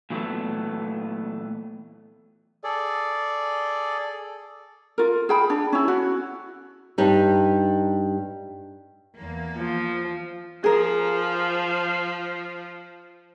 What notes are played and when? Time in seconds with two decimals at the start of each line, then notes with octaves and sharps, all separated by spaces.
0.10 A#2 E3 F#3 G#3 A3 B3
2.64 G#4 A4 D5
4.98 F4 A#4
5.29 G#4 G5 B5
5.50 D4
5.72 C#4 E4
5.88 F#4
6.98 G2 G3 D#4
9.17 E2 A#3
9.58 F3
10.64 F3 G#4 A#4